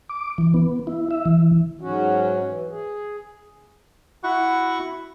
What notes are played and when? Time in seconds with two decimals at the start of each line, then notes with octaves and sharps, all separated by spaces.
0.10 D6
0.38 E3
0.54 B3
0.87 E4
1.11 E5
1.25 E3
1.81 G#2 F#3 C#4 F#4
2.47 E3
2.70 G#4
4.24 E4 F#4 F#5 C#6